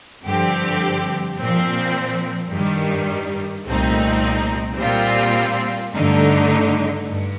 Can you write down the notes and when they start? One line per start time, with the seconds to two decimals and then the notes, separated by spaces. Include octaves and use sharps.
0.23 G2 D3 F3 C4 G4
1.38 A#2 F3 C4
2.51 G2 D#3 G3
3.66 C2 A#2 A3 C4 D#4
4.79 A#2 G3 C4 F4
5.94 G2 D3 A3 D#4
7.07 G2